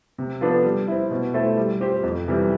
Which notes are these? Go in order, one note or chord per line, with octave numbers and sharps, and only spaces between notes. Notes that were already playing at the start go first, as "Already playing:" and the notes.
C3
F3 B3 D4 A4
G3
C4 E4
B2
A3 E4 A4 C5
G3
C4 G4 C5
F2
C3 E3 G3